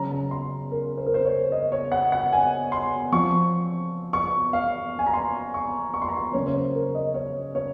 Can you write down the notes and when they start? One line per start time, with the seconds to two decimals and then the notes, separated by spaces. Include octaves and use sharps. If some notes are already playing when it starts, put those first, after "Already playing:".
Already playing: C#3 F#3 C#4 A#5
0.11 A#5
0.31 C6
0.71 A#4
0.98 C5
1.06 A#4
1.14 C5
1.25 C#5
1.52 D#5
1.72 C#5
1.92 F#5
2.12 F#5
2.33 G#5
2.72 C6
3.12 F3 C4 C#6
4.13 C#6
4.53 F5
4.99 G#5
5.07 A#5
5.14 C6
5.54 C#6
5.94 C#6
6.02 C6
6.09 A#5
6.17 C6
6.33 C#3 F#3 A#3 C#4 C#5
6.46 C#5
6.54 C5
6.75 A#4
6.95 D#5
7.14 C#5
7.55 C#5